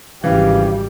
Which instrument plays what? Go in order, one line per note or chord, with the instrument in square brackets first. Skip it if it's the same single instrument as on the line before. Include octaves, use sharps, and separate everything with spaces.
[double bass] G#1 G3 [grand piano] C#3 E3 [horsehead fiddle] G4 [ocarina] F5